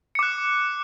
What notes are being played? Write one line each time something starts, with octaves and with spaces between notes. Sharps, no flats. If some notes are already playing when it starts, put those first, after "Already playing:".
D6 F#6 C#7